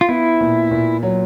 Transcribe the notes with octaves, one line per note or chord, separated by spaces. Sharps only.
F4
B3 E4
A#2
A#2
F#3